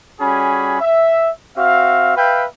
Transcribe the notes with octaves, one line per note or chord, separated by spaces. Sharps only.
G3 C#4 F#4 G#4 G#5 B5
E5
C4 F#4 E5 F5
B4 E5 F5 G5